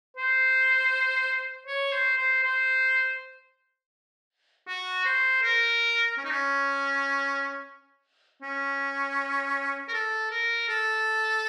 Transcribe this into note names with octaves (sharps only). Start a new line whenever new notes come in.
C5
C#5
C5
C5
C5
F#4
C5
A#4
C#4
D#4
C#4
C#4
A#4
A4
A#4
A4